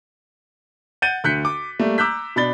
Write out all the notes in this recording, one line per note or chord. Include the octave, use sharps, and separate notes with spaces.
F#5 G6 A6 D#7
D2 F#6 G6 B6 C#7
D6
G3 A3 A#3
A#5 D6 E6 F#6 G6 B6
B2 D4 B5 A6 G7